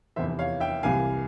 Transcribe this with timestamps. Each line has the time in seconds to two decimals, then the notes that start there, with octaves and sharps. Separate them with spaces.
0.16 F1 E2 C3 E3 C5 E5
0.39 C#5 F5
0.60 E5 G5
0.83 C2 C3 E3 A#3 F5 G#5